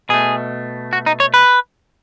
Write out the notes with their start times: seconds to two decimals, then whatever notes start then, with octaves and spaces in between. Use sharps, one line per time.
0.09 B2 A3 G#4
0.93 F#4
1.06 D#4
1.20 C#5
1.34 B4